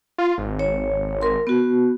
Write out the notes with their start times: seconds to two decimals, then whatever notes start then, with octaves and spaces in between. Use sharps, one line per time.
0.18 F4
0.38 G#1
0.59 C#5
1.22 A#4 C6
1.47 B3 F#4